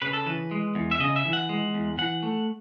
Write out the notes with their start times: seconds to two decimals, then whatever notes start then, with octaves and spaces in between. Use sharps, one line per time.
0.02 C#3 B4
0.13 A4
0.26 E3 B4
0.51 G#3
0.75 E2
0.91 E5
1.00 C#3 D#5
1.16 E5
1.25 E3
1.33 F#5
1.49 G#3
1.74 E2
1.98 E3 F#5
2.23 A3